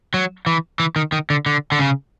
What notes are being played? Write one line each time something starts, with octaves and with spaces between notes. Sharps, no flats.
F#3
E3
E3
D#3
D#3
D3
D3
D3
C#3